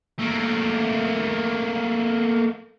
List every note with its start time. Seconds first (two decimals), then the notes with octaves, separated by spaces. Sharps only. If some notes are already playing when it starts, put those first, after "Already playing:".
0.19 A3 A#3